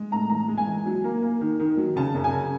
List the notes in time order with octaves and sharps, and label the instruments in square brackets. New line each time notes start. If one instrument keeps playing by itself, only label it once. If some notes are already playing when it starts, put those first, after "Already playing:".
Already playing: [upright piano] G#3
A2 A#5
E3 A#5
G#3
G#5
E3
F#3
A#3
A#3
D#3
D#3
F#3
C#3 A5
F#2
G#5
C#3